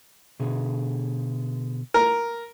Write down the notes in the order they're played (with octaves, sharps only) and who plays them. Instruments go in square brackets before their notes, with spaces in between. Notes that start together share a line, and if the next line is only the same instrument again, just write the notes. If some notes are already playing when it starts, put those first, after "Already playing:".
[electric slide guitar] B2 D3 G#4
[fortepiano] A#4